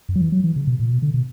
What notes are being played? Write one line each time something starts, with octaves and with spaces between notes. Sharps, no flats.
F#2
F#3
E3
F#3
E3
C#3
B2
A#2
B2
D3
B2